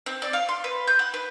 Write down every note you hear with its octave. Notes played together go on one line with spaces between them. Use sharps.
C4
D5
F5
C6
B4
G6
F#5
B4